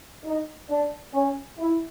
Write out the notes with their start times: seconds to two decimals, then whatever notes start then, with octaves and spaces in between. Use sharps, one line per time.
0.25 D#4
0.69 D4
1.14 C#4
1.59 E4